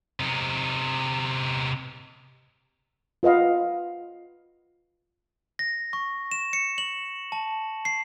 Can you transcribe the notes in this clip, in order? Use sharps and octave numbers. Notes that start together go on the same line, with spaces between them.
C3 D#4
F4 B4 D#5 F5 F#5
A#6
C#6
E7
C#7
F#7
A5
C7